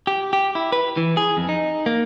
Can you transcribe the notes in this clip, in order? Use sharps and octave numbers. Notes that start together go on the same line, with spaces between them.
G4
G4
E4
B4
E3
G#4
F2
D#4
A#3